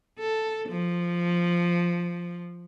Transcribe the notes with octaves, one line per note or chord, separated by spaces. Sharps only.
A4
F3